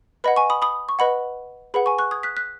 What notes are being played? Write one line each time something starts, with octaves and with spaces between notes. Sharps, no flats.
B4 D#5 F#5 B5
G#5 C#6
B5 D#6
B5 D#6
C#6
B4 D#5 F#5 B5
G#4 B4 F#5 B5
G#5 C#6
C#6 F#6
D#6 G#6
F#6 B6
F#6 B6